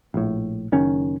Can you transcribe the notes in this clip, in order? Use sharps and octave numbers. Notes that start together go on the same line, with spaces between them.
A#1 A2
F#1 D#3 C#4